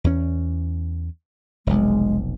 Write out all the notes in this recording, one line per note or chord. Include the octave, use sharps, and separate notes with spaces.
E2 C#4
F1 B1 G#3